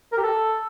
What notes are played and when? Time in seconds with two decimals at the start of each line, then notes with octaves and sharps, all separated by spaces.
0.12 A#4
0.18 G4
0.23 A4